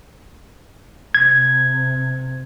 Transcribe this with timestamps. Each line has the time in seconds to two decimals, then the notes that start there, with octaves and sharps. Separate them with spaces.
1.15 C3 G#6